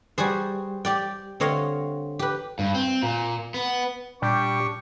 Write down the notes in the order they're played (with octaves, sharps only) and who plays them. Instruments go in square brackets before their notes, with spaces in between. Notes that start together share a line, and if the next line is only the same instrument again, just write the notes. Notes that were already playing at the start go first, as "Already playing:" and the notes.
[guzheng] G3 F#4 G#4 C5
G4 D5 G5
D3 C4 C#5 D#5 F5
G4 B4
[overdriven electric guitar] G2
C4
A#2
B3
[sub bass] A#2 [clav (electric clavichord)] G3 [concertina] D4 G4 G5 [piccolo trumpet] C#6